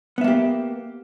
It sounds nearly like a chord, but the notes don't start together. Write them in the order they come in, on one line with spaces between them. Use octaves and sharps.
B3 E5 A#3 G4